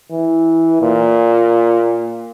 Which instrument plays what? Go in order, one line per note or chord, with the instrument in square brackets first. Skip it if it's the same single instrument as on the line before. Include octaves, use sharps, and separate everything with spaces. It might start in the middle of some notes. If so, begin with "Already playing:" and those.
[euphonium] E3
A#2